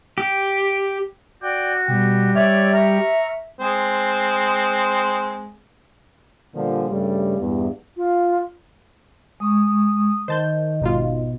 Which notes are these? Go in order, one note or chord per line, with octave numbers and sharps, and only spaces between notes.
G4
F#4 D5 G5
B2 G3 G4
C#5 D5 E5 F6
A#5 C#6 F6
G#3 C4
A#2 D3 F3 G3
G2 C#3 G3 A3
E2 G2
F4
G#3 C#6 D#6
D#3 C5 D#5 A5 G6
G#1 B2 D#4 F4